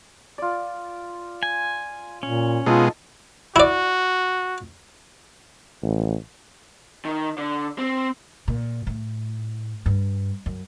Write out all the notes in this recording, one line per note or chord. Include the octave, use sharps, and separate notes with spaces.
F4 D5
G#5
A#2 C#4
B2 G#3 D#4 F4 A4
E4 F#4 D5
A1
D#3
D3
C4
A#2
A2
G2
F#2